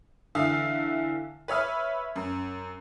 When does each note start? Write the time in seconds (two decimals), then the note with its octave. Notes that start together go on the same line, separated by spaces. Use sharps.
0.35 D3 E3 E5 F5
1.48 B4 C#5 E5 F6
2.16 F#2